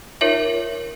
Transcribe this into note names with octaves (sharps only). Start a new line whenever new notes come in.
D#4 F4 A#4 C#5 E5